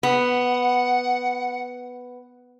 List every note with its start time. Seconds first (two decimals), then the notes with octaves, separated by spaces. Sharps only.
0.03 B3 F#5